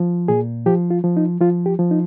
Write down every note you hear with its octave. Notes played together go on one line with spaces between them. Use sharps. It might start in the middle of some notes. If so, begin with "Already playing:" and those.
Already playing: F3
A#2 G#4
F3 G4
F4
F3
D#4
F3 F4
G4
F3
D#4